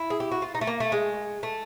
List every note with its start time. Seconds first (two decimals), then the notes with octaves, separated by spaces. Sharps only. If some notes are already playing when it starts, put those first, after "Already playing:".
Already playing: E4
0.10 G#4
0.20 G4
0.32 F#4
0.42 F4
0.55 D#4
0.61 A3
0.67 A#3
0.80 A3
0.92 G#3
1.43 A3